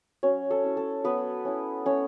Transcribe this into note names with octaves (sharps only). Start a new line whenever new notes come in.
F#3 C#4 C#5
A4
C#4 E4
A4
F#3 B3 B4
C#4 E4
A3 C#4 C#5